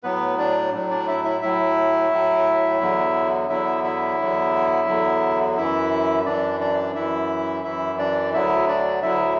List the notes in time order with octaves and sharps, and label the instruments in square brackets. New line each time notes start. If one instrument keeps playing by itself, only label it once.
[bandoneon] A2 F#3 B3 B4
D4 D5
A2 F#3
D4 D5
E4 E5
E4 E5
A2 F#3 E4 E5
A2 F#3
E2 D3 F#3
E2 D3 F#3 E4 E5
E4 E5
E2 D3 F#3
E2 D3 F#3
F#2 E3 E4 E5
F#2 E3 D4 D5
D4 D5
F#2 E3 E4 E5
F#2 E3 E4 E5
D4 D5
D2 D3 F#3 E4 E5
D4 D5
D2 D3 F#3 E4 E5